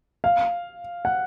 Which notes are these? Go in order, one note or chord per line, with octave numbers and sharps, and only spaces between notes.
F5
F#5